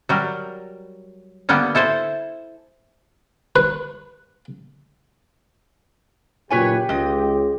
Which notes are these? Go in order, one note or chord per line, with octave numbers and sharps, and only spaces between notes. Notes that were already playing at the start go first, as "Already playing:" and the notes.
F#3 G3 A#4
D3 G3 A#3 B3
E4 A4 C5 G#5
B4
F#1 A#2 G4 B4 C#5 G#5
C#2 G#3 D#5